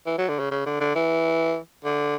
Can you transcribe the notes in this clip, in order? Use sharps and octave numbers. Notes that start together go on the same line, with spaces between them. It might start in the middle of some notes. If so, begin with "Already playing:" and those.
E3
F#3
D3
C#3
C#3
D3
D3
E3
D3